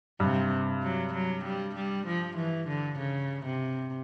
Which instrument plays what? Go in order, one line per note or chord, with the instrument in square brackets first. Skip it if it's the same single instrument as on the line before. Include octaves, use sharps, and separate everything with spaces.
[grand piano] G2 [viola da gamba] C3
[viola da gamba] F#3
F#3
G3
G3
F3
E3
D3
C#3
C3